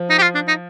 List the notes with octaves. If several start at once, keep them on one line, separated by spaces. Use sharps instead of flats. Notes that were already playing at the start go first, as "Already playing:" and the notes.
Already playing: F3
D#4
G4
F4
D4
D#4